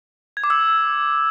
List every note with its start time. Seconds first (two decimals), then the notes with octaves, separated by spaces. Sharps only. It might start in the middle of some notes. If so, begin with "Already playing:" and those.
0.37 G#6
0.44 D6
0.50 E6